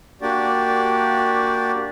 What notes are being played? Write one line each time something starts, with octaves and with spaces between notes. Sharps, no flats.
A#3 D4 F#4 G4 D5